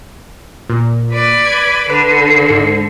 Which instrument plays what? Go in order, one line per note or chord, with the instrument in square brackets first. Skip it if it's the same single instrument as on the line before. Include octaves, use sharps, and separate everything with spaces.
[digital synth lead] A#2
[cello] B4 D5
[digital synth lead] G#6
[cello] D3 [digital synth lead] B4
[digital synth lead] G#2